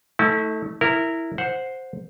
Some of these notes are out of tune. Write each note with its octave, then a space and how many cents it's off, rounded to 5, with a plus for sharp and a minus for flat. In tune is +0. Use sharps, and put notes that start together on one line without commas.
A3 +0 E4 -45
E4 +0 A#4 -15
C5 +0 F#5 -15